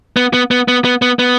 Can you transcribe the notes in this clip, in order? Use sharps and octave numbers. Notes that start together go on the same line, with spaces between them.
B3
B3
B3
B3
B3
B3
B3